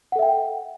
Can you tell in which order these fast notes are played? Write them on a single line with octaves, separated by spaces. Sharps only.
F#5 A4 E5 G5